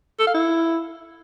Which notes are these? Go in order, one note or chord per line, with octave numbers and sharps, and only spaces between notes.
A4
F5
E4